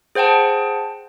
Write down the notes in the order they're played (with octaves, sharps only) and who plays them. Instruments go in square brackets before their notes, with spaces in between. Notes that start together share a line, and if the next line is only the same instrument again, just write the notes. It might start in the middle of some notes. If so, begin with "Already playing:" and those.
[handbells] G#4 C5 F#5 G5 A5